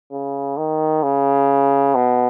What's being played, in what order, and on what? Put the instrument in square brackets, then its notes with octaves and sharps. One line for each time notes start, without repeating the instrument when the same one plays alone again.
[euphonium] C#3
D#3
C#3
B2